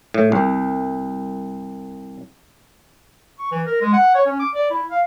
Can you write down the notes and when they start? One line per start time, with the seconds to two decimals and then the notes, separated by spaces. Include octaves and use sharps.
0.14 A2
0.32 C2
3.39 C#6
3.51 E3
3.66 A#4
3.82 G#3
3.93 F#5
4.15 C#5
4.26 C#4
4.40 D6
4.55 D5
4.71 E4
4.91 F5